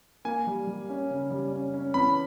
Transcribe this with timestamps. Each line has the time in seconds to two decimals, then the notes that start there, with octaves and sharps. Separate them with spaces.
0.25 A#3 G#5
0.47 G3
0.67 G3
0.89 C#4
1.10 C#3
1.30 G3
1.53 C#4
1.74 C#4
1.94 E2 B5